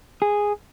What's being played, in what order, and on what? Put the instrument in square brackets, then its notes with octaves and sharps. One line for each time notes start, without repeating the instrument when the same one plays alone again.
[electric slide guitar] G#4